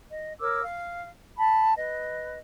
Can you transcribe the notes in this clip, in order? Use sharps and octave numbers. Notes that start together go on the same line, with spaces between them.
D#5
A#4 C#5 D6 E6
F5
A5 B5
B4 D#5